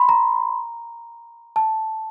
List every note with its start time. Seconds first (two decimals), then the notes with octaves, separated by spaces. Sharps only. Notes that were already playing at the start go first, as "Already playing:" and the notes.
Already playing: B5 C6
0.09 A#5
1.56 A5